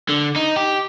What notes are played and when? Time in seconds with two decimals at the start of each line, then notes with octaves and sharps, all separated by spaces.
0.09 D3
0.36 D#4
0.56 G4